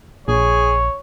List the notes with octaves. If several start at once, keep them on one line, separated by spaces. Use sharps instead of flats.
A#1 G#4 C#5